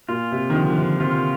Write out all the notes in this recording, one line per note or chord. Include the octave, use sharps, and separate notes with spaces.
A#2 F4
C3
D#3
D3 F3
D3
C3
C3 F4